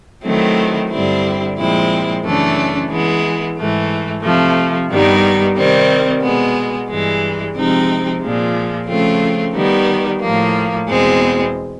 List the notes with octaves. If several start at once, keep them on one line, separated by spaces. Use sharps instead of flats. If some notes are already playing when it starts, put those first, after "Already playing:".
D#3 F#3 A3 C4 E4
G2 D3 G3 C4 E4
A#2 F3 G#3 C4 E4
F#2 C#3 E3 A3 D4
E3 G#3 B3
G#2 E3 A3
C3 F3 A3
G2 D#3 G3 B3 D#4
C3 D#3 G3 C4
B2 G#3 B3
G2 E3 G#3
C3 F3 G#3 C4 D#4
A#2 F3 G#3
C#3 F3 A3 C4 F4
D#3 G3 B3 D#4
A2 F3 A#3
E2 B2 G#3 C4